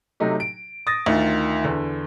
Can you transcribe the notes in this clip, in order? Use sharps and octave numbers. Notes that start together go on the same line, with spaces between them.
C3 F#3 A3 D#4 G4
D7
D#6 A6 A#6
D2 D#3 F4
E2 D3